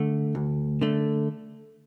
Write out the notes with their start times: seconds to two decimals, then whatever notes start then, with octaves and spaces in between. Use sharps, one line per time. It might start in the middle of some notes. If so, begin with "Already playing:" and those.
Already playing: D3 A3
0.35 D2
0.81 D3 A3